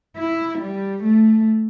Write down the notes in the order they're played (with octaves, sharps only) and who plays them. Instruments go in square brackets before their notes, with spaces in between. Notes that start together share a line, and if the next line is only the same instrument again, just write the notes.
[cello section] E4
G3
A3